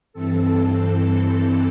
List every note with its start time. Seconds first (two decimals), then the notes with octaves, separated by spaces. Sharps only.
0.13 G2 E3 C4 A4